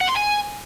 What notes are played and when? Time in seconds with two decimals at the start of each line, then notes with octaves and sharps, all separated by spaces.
0.01 F#5
0.09 C6
0.17 G#5